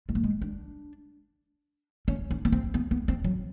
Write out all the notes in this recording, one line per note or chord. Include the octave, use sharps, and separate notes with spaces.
G#3
A3
G#3
D4
C#4
C#4
B3
C4
B3
B3
C4
F#3